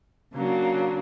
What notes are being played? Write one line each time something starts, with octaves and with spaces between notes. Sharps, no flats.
C#3 F#3 A#3 D4